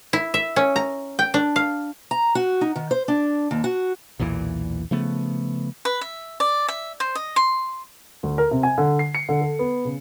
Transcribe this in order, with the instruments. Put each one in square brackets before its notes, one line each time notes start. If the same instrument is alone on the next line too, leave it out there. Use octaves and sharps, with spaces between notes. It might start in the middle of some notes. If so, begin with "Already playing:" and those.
[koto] E4
E5
C#4
A#5
G5
D4
F5
[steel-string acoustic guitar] A#5
F#4
D#4
D#3
C5
D4
D#2
F#4
[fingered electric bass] B1 E2 A#2 E3
C#3 F3 A3 B3
[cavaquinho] B4
E5
D5
E5
C5
D#5
C6
[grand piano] D2
A#4
C3
G#5
D3
C7
C#7
D3
A4
B3
C#3